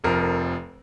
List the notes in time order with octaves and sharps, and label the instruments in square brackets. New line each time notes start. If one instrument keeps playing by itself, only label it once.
[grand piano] F1 F2 F3 A#4
A#4